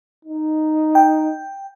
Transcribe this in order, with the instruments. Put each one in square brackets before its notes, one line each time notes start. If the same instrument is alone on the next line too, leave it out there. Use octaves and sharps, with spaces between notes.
[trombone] D#4
[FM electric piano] G5